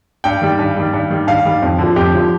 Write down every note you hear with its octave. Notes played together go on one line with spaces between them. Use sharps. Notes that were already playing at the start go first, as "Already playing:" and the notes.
G2 G5
D#3 G3
G2
D#3 G3
G2
D#3 G3
G2 F5
D#3 G3
F2
D3 F3
F2 G4
D3 F3